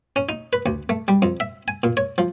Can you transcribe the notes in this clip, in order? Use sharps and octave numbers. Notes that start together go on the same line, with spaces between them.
C#4
D#4
B4
D2
A3
G3
F2
E5
G#5
A#2
C#5
F3